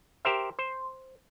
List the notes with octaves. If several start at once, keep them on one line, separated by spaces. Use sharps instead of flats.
G4 A#4 C5 E5
C5